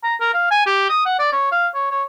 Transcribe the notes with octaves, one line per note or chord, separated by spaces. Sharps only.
A#5
A#4
F5
G#5
G4
D#6
F#5
D5
C#5
F5
C#5
C#5